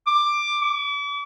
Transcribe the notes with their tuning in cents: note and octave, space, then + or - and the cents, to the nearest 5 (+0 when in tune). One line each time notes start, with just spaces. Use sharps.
D6 +10
D6 -40